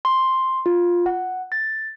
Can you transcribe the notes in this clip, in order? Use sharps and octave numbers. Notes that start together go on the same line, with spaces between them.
C6
F4
F#5
A6